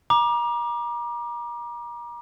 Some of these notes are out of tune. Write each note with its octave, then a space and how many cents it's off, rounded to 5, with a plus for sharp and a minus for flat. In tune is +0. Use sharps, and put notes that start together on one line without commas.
A#5 +35 D6 +20